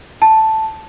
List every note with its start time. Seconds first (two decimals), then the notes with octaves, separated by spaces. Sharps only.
0.22 A5